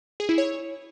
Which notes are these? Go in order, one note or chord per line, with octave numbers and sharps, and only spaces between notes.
G#4
E4
C#5